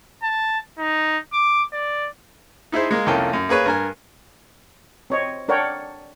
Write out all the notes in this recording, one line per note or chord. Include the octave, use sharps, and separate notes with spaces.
A5
D#4
D6
D5
D#4 E4 G#4 C5
G#3 A#3
C2 F2 A#3 C#4 A4 G5
F#2
A#3 G#4 B4 C#5
G2 A#4 G#5
C4 C#5 D#5
D4 A#4 C#5 D5 F#5 G5